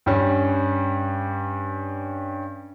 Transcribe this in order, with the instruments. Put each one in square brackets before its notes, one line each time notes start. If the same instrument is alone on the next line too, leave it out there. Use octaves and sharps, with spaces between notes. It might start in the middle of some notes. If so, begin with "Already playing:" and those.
[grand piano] G2 G3 C#4